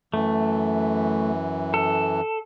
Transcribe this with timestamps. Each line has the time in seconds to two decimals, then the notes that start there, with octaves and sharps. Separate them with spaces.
0.14 F#2 E3 A3
1.74 A4